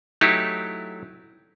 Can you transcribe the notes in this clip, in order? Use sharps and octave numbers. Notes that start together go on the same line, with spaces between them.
F#3 A3 D#4 E4 G4